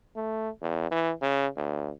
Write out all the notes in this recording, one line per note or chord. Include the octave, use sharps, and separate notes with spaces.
A3
E2
E3
C#3
D2